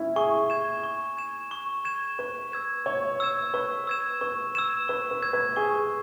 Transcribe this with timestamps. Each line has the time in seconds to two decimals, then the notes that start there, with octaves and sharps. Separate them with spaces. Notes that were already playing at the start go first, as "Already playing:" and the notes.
Already playing: C#4 E4
0.16 G#4 C#6
0.50 G#6 E7
0.84 C#6
1.17 G#6 E7
1.51 C#6
1.85 G#6 E7
2.18 B4 C#6
2.52 E6 G#6 E7
2.86 C#5 C#6
3.20 E6 G#6 E7
3.54 B4 C#6
3.87 E6 G#6 E7
4.21 B4 C#6
4.55 E6 G#6 E7
4.88 B4 C#6
5.11 B4
5.23 E6 G#6
5.33 B4
5.56 G#4 C#6